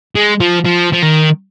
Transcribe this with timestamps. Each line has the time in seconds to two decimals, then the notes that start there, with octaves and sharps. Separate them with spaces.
0.15 G#3
0.41 F3
0.65 F3
0.93 F3
1.03 D#3